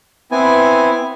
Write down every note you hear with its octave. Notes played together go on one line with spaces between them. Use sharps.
B3 C4 E4 G#5